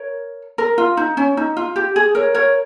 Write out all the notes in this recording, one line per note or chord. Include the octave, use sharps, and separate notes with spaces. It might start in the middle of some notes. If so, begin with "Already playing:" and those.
Already playing: A#4 C#5
A#4
F4
D#4
C#4
D#4
F4
G4
G#4
A#4 C#5
A#4 C#5